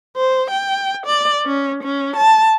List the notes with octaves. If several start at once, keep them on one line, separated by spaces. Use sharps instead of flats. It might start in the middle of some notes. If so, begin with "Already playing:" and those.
C5
G5
D5
C#4
C#4
A5